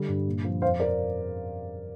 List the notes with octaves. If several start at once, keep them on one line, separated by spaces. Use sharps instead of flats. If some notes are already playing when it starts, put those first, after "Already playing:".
Already playing: D3 G3
G2
A#2
F3
F2 C5 F5
F3 A#4 D5